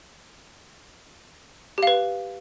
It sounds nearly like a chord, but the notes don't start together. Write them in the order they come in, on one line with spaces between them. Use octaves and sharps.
G4 F5 B4